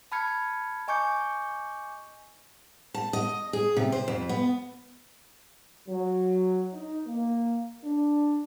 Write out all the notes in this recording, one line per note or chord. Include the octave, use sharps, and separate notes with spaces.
A5 B5 F6 G#6 C#7
D#5 G#5 C#6 D6 G6 C#7
A5
D#5
G#4
C3
C5
F2
B3
F#3
D#4
A#3
D4